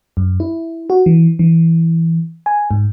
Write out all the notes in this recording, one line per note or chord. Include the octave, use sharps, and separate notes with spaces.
F#2
E4
F#4
E3
E3
G#5
G#2